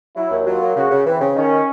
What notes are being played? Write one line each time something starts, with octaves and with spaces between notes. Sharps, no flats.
F#3 E4
D#2
F#3 F4
A#3
C#3 F#4
C#3
E3 C4
C#3
D#3 C#4